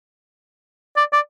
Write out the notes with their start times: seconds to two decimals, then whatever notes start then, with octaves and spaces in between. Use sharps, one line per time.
0.97 D5
1.13 D5